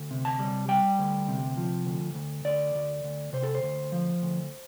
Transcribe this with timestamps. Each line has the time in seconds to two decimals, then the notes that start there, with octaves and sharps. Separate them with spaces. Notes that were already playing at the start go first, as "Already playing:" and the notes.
Already playing: D2
0.11 C3
0.25 A5
0.39 G3
0.68 G3 G5
0.99 D2
1.28 C3
1.57 F3
1.86 D2
2.15 D2
2.45 D2 D5
2.75 D2
3.04 D2
3.33 C3 C5
3.43 A4
3.55 C5
3.63 D2
3.92 F3
4.22 D2